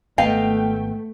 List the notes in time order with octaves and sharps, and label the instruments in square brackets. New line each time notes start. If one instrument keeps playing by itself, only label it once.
[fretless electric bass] G#1 B3 [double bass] A3 [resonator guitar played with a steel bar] D#5 F5 [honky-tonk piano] G5